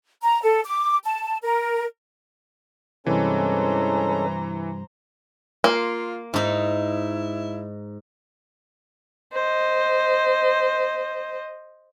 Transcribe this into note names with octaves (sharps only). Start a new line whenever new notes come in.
A#5
A4
D6
A5
A#4
G2 C3 E3 G#3 C#4 A4 C5 A#5
A#3 F4 C6
G#2 D#4 E4
C5 D#5